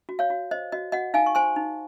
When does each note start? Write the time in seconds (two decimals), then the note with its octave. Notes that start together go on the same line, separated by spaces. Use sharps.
0.09 F#4
0.19 C#5 F5
0.30 F#4
0.51 C5 D#5
0.72 F#4 D#5
0.92 F#4 D#5 F#5
1.14 D#4 F5 G#5
1.26 C#6
1.35 C5 G#5 C6
1.56 D#4